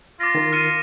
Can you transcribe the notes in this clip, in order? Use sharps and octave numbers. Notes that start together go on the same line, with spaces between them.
F4 D6 A6 A#6
D#3 A#4
F4 F6 C#7 D#7